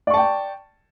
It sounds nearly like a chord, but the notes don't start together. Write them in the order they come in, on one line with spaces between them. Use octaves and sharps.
D5 C#6 A5 G5